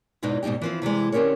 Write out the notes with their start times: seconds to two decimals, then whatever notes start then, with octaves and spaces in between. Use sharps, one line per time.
0.22 E2 G#2 B2 E3 D#4
0.43 G#2 B2 G3 D#4 G4
0.62 E3 F3 C4
0.82 C3 E3 G3 G#3
1.12 D3 C4 C#4 G4 A#4 C#5